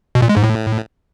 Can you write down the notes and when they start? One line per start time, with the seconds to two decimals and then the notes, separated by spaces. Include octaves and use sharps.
0.15 B2
0.22 A#2
0.29 G#3
0.37 G#2
0.44 A2